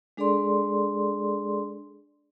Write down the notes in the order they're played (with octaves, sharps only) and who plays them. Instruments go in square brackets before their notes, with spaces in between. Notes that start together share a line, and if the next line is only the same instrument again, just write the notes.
[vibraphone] G#3 D4 G#4 A4 D5 C6